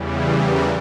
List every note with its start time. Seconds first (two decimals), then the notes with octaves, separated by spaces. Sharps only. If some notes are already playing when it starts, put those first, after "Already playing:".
Already playing: E2 C#3 E3 G3
0.45 A#4